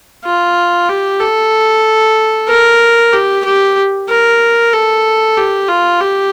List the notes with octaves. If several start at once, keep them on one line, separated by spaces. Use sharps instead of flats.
F4
G4
A4
A#4
G4
G4
A#4
A4
G4
F4
G4